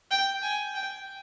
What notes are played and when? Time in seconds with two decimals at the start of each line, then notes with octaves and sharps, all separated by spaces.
0.11 G5
0.42 G#5
0.75 G5